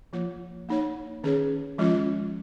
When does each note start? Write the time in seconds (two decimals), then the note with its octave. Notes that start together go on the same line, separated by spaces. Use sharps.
0.13 F3 A#3 F4 C#5
0.69 A#3 D#4 C#5
1.24 D#3 C#4 G#4 C#5
1.78 F3 G#3 C#4 F4